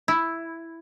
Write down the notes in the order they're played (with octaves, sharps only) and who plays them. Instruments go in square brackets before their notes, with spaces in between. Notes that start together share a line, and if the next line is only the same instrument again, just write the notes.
[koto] E4